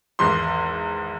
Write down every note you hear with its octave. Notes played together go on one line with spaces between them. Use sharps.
G#1 E2 C6